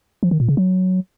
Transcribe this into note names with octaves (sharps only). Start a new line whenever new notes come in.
F3
D#3
A#2
C#3
F#3